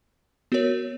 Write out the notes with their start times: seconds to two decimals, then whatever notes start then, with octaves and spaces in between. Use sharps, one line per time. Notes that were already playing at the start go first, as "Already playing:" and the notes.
0.52 B3 F#4 A#4 C#5